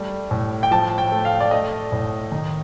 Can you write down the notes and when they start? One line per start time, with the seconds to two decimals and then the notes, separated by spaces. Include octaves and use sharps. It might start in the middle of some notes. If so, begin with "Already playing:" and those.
Already playing: G3 A3
0.31 A2
0.63 G5
0.71 F3 A5
0.98 G5
1.12 A3
1.25 F5
1.40 D5
1.51 A3 D#5
1.92 A2
2.32 D#3